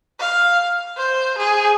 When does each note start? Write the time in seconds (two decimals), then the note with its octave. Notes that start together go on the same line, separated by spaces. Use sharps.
0.20 F5
0.97 C5
1.38 G#4